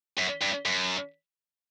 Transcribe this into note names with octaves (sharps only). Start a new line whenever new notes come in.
F#2
G2
F#2